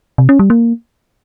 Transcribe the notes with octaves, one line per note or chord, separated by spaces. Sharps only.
C3
C#4
G3
A#3